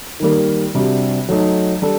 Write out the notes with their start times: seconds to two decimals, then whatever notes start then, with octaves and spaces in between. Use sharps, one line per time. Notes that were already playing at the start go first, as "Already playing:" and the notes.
0.20 D#3 G3 A#3
0.75 C3 G3 D4 F#4
1.29 F#3 A3 D#4
1.82 G3 D4 A4